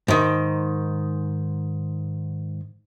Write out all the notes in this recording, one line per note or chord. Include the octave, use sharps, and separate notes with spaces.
G#2 D#3